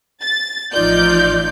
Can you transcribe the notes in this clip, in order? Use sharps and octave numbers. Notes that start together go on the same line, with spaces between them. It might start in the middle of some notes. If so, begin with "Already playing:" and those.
A6
A1 F3 D#4 F4 D5 G6